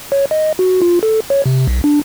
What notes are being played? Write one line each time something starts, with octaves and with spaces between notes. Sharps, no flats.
C#5
D#5
F#4
F4
A4
C#5
C3
B1
D4